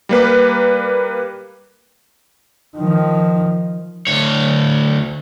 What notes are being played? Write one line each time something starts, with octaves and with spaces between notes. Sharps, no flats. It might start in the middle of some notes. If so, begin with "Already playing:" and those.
G3 A#3 B4
D#3 F3
D2 C#5